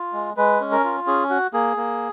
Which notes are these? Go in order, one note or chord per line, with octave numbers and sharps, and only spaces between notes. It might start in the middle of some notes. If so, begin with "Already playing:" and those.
Already playing: F4
G#3
G#3 B4
C#4
A#4
F4
C#4 G#4
F#4
A#3 G#4
A#3